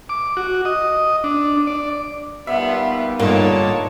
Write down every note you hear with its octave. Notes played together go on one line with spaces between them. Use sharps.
D6
F#4
D#5
D4
D5
D#2 G3 B3 F4 E5
G2 A#2 D3 A#3 D#4 C#5 A5